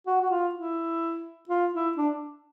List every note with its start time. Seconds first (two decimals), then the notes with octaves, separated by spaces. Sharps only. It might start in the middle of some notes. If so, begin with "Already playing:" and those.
0.07 F#4
0.22 F#4
0.30 F4
0.55 E4
1.49 F4
1.73 E4
1.97 D4